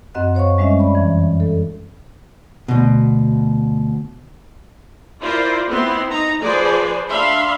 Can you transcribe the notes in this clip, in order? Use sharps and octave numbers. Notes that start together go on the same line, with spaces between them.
F#2 C4 D#5 F#5 F#6
C5 C#5 F5 C#6
G3 G#3 C#4 D4 D#5 E5
D5 B5
F2 E3
A4
D2 B2
E4 F4 A#4 C5 D5
B3 C4 E4 C6
D#4 A#5
F3 G#4 B4 C5 D5
D4 E5 F5 B5 C6